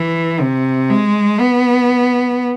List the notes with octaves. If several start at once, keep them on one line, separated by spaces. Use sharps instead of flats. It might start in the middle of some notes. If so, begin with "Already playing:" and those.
Already playing: E3
C3
G#3
B3